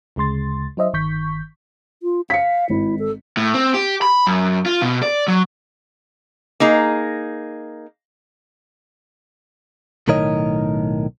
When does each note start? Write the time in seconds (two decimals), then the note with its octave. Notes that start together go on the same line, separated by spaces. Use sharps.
0.16 D2 C#3 G#3 C6 A6
0.77 F#3 D#4 C5 D#5 E5
0.93 G1 D#3 C#6 G6 B6
2.03 F4
2.30 F5 B6 C#7
2.70 G#1 E4
2.99 A4
3.37 A2
3.54 C4
3.74 G4
4.02 B5
4.27 F#2
4.66 F4
4.82 B2
5.03 D5
5.28 F#3
6.60 A#3 D#4 G#4
10.08 B1 A2 D#3 A#4 C#5 D#5